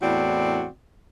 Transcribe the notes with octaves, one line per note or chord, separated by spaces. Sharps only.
E2 A2 C4 F#4 D5